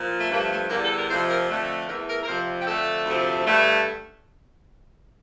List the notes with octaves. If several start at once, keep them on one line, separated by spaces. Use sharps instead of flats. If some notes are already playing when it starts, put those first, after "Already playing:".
Already playing: A#2 F3
A3
G2 F3 A3 A#3
A3
E2 D3 G3 A#3
A4
A#4
F2 C3 F3 A3 C5
A#4
F2 D3 A3
E2 E3 A3 A#4
A#4
A#4
F2 C3 F3 A3 C5
G4
F2 D3 A3 A4
D2 C3 F3 A3
G2 D3 A3